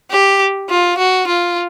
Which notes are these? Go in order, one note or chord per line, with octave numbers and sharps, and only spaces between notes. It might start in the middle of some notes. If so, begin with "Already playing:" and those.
G4
F4
F#4
F4